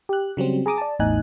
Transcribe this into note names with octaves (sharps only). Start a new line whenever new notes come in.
G4 F#6
C#3 F#3 G3 C4
G#4 A#5 D6 D#6
D5 A5
A1 E2 A2 D#4 G#5 F#6